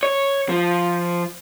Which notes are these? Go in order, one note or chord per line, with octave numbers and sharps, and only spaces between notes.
C#5
F3